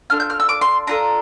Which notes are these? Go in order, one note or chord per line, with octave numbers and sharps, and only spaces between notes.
D4 F4 A4 F6
G6
F6
E6
D6
C6
D4 F4 A4 A#5